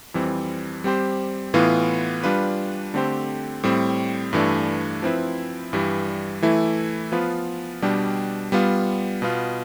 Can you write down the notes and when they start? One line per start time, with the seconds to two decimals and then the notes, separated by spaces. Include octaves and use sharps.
0.14 F2 E3 G3 C4
0.84 G3 C4 G4 C5
1.54 A2 E3 B3 F4
2.24 G3 D4 F4 B4
2.94 D3 A3 C4 G4 C5
3.63 A2 G3 C4
4.33 G2 E3 A3 D4
5.02 F3 C4 E4 B4
5.73 G2 E3 G3
6.42 E3 A3 E4
7.12 F3 B3 F4 B4
7.82 B2 G3 D4 G4
8.52 G3 B3 F4
9.22 B2 B3 F4